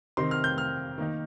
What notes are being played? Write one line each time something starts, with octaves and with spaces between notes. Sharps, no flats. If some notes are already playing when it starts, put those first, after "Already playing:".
C3 D#3 C4 D#4 C6
F6
G6
F6
D#3 A#3 D#4